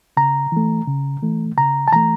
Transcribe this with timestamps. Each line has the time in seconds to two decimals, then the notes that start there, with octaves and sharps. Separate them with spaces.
0.17 C#3 A#5
0.52 E3 A3
0.88 C#3
1.22 E3 A3
1.57 C#3 A#5
1.88 A5
1.92 E3 A3 A#5